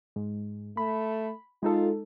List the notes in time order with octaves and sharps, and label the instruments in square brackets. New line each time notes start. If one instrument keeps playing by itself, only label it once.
[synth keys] G#2
[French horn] A3 [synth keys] B5
[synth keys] G#3 D#4 A4 [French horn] F4